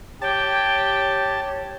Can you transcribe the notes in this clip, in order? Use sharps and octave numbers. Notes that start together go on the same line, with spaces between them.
G4 C#5 G5 A5